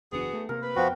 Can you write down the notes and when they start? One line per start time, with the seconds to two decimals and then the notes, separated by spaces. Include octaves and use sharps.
0.13 F#1 E2 B3 D4 F#4 G#4
0.33 A3
0.49 C3 A#3 A#4
0.63 B4
0.76 F2 F3 B3 F#4 G5